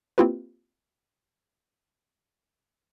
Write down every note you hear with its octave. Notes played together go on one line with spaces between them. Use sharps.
A#3 C4 E4 F4 G4 B4